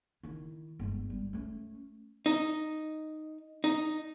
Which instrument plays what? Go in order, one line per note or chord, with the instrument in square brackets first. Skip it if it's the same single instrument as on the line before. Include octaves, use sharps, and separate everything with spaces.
[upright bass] D#3 E4
G1 G#3
G3
A3 C#4
[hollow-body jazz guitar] D#4
D#4